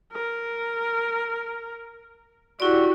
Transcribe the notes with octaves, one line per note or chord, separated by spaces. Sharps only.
A#4
E4 F#4 G4 D5